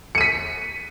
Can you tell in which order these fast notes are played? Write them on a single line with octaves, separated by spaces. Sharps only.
C#7 D#7 B6